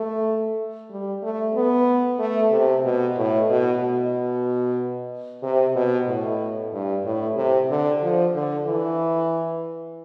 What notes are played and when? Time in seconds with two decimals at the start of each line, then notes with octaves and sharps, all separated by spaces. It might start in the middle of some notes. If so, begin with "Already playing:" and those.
Already playing: A3
0.90 G3
1.23 A3
1.55 B3
2.19 A3
2.51 C3
2.84 B2
3.17 A2
3.49 B2
3.81 B2
5.43 C3
5.76 B2
6.07 A2
6.73 G2
7.05 A2
7.37 C3
7.70 D3
8.03 F3
8.34 D3
8.66 E3